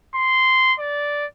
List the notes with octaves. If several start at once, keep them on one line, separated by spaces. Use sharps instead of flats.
C6
D5